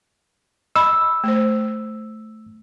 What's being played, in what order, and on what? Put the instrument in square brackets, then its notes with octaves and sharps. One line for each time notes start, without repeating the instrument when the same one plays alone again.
[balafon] D#5 B5 [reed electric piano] E6
[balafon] A3 C5